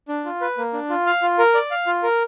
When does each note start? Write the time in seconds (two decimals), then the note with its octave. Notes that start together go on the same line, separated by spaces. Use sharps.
0.08 D4
0.25 F4
0.41 B4
0.58 A#3
0.73 D4
0.90 F4
1.06 F5
1.22 F4
1.38 A#4
1.54 D5
1.71 F5
1.87 F4
2.03 A#4